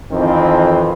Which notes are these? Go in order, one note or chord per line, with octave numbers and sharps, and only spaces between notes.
F2 D#3 E3 C4